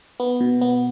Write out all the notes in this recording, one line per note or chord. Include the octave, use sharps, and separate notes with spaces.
B3
B2
B3